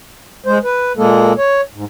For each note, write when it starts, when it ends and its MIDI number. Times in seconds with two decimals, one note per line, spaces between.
0.46 0.58 56
0.46 0.58 72
0.64 0.93 71
0.97 1.33 46
0.97 1.33 56
0.97 1.33 58
0.97 1.33 69
1.38 1.61 73
1.74 1.85 44